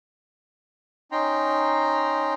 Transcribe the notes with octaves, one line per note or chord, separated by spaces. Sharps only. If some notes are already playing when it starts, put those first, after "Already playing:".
C#4 D#4 G5 A#5 C6